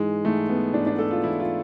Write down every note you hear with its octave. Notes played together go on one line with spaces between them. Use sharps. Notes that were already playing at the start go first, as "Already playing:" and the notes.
Already playing: G#2 E3 G#3
G#2 E3 A3
B3
G#2 E3 D4
D4
A4
F4
G#2 E3 E4
F4